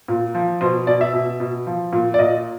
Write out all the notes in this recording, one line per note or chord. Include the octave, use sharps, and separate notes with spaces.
A#2
F3
B2 C5
B2 D5
E5
B2
B2
F3
A#2
D5
A#2 D#5